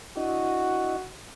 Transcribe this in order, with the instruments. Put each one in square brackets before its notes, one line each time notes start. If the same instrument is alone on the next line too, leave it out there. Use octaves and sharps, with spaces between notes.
[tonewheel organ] D4 E4 D#5 [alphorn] F#4